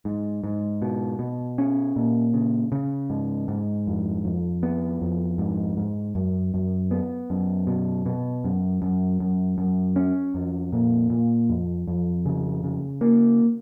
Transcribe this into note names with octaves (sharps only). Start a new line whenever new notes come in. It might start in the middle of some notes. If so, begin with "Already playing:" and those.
G#2
G#2
B2
B2
C#4
A#2
C#3
C#3
G#2
G#2
F2
F2
B3
F2
G#2
G#2
F#2
F#2
B3
F#2
B2
B2
F#2
F#2
F#2
F#2
C#4
F2
A#2
A#2
F2
F2
C#3
C#3
A#3